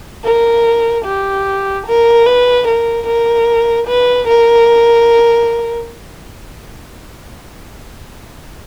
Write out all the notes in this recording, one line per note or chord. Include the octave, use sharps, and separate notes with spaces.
A#4
G4
A#4
B4
A#4
A#4
B4
A#4